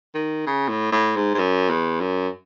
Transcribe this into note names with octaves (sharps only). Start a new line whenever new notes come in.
D#3
C#3
A2
A2
G#2
G#2
F#2
E2
F#2